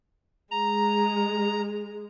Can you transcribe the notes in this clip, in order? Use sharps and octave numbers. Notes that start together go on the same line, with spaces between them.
G#3 A#5